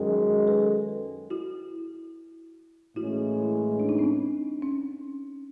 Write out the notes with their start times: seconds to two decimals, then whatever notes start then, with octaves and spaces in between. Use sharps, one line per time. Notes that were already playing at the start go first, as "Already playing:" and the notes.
Already playing: F#2 D#3 G#3 G#4 A#4
0.47 A4 B4
1.30 E4 F#4
2.96 A2 E3 G#3 C#4 E4 F#4
3.80 D4
3.89 D#4
3.98 C4 D4
4.62 C#4